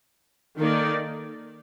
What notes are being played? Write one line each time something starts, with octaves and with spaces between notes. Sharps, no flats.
D#3 A#3 D#4 A4 D5